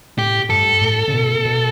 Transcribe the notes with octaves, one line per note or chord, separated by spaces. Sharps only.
A2 G4
G2 A4
A2
C#3
B2
B2